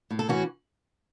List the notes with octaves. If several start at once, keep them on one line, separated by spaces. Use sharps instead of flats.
A2
A4
E3 C#4 F#4